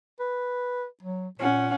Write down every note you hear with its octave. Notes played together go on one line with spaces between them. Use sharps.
B4
F#3
A#2 C#4 F#5